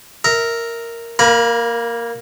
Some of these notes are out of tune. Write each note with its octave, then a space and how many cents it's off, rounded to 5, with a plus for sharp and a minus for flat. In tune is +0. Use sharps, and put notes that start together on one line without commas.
A#4 -5 E5 -20
A#3 +0 A#4 +40 B5 -15